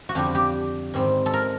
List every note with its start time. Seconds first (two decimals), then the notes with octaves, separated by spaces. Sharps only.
0.09 F#4
0.15 F2 D3 G3 G4
0.35 G4
0.94 G#2 D#3 G3 C4
1.26 A4
1.34 A#4